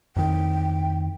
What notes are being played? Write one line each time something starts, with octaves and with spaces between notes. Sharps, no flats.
F2 D#3 G5